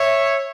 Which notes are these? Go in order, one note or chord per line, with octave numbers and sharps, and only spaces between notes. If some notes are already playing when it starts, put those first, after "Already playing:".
Already playing: C#5 E5